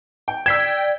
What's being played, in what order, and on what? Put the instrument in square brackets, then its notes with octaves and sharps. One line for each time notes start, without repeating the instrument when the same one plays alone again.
[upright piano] G5
[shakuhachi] D5 [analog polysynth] G5 [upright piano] E6 B6 E7 [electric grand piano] G#6